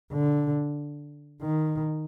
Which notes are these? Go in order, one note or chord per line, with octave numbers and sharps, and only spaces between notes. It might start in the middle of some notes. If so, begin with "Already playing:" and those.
D3
D#3